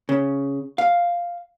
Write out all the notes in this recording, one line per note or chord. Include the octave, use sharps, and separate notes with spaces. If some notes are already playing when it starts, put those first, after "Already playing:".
C#3
F5